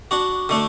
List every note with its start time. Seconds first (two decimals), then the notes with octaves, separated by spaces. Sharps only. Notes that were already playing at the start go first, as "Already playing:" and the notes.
0.11 D4 F#4
0.49 D3 A3 D4